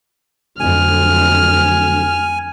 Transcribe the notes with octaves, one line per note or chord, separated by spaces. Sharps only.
F2 D3 F#3 A3 G#5 F6